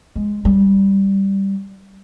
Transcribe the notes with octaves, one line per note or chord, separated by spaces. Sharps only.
G#3
G3